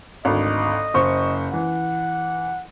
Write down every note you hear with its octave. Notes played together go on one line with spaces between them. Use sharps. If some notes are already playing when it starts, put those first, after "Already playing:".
G#1 D2 D#5
F#1 C5 C#6
E3 F#5